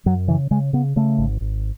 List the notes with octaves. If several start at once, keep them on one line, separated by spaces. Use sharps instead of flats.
F#2 F#3
C#3 E3
C#3 G#3
C#3 B3
C#3 A3
G#1
G#1